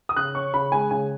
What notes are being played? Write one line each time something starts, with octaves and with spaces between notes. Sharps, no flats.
D#6
C#3 F#6
C#4 C#6
C#3 B5
G#3 G#5
C#3 G#5